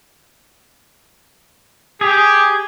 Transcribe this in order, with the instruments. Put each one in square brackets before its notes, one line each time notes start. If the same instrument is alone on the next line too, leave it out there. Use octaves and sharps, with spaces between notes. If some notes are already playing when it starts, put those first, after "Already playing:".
[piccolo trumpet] G4 [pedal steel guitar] G#4